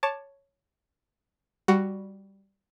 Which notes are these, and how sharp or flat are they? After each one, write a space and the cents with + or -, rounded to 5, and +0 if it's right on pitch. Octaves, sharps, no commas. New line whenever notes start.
C#5 +0 A5 +0 D6 +15
G3 +0 F#4 +10